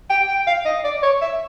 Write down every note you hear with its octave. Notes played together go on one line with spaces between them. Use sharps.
G5
G5
F5
D#5
D5
C#5
E5